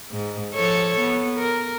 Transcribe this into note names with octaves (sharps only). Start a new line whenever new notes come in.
G#2
F3 A4 C#5
B3
A#4